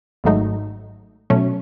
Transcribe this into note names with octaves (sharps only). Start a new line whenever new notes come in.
G#1 G#2 F#3 A3 D#4
B2 F#3 A3 C#4